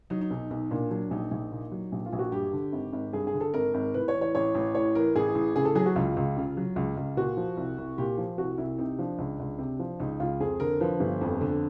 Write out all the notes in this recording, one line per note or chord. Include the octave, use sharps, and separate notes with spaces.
F#3 D#4
D#4
B1
B1
A#2 D4
F#3 D4
A#1 D#4
A#1
A#2
F#3
A#1
F4
A#1
F#4
G2 G4
D3
G#1
G#1
G2 G#4
G#4
D3
A4
G#1 A#4
G#1
A2 B4
C#5
E3
C#5
A1 C#5
A1
A2 C#5
E3 A#4
A1 G#4
A1
C#3 G#4
A4
F#3 G#4
F#4
C#2 F4
C#2
C#3
F#3
C#2
C#2
A#2 F#4
F3
C2
C2
A#2 G4
F3
C2 F#4
C2 E4
C3 D#4
F3 D4
C#2
C#2
C3
F3
C#2 D#4
C#2 F4
F2 G#4
D3 A#4
F3 B4
G1
F2
D3